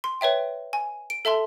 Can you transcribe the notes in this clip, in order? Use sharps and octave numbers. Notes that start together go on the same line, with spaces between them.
C6
B4 C#5 E5 G5
G#5
D7
A4 E5 A5 C6